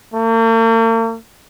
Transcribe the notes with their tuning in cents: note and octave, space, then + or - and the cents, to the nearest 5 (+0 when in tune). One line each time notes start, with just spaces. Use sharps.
A#3 -45